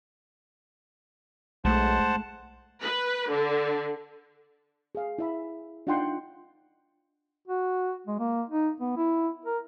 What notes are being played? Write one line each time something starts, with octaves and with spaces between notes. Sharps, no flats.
B1 G#3 A3 C5 F#5 A5
B4
D3
G#4 F5
E4 E5 B5
D4 D#4 F4 F#5 G5 C6
F#4
G#3
A#3
D#4
B3
E4
A#4